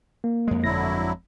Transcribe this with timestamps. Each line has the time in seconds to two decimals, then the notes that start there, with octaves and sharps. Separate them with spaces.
0.24 A#3
0.48 F2 G#3
0.64 G1 D3 F#3 E4 A#6